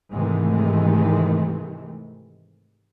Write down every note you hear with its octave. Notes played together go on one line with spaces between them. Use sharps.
G#2 C3 D#3 E3 G#3 A3